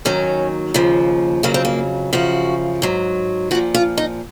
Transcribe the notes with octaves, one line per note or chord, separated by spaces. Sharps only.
D#2 D#3 F#3 C#4
D#2 C#3 F3
F2 C#3 F#3 A#3
C4
A#3
F#2 C#3 F3 F#4
G#2 F#3
A#2 F3 F#4
F4
D#4